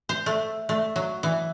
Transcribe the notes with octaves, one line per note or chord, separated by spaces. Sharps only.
C5
A3
A3
F#3
E3